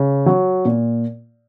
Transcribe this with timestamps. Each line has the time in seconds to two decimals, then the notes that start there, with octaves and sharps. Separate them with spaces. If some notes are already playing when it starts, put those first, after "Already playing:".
Already playing: C#3
0.26 F#3
0.65 A#2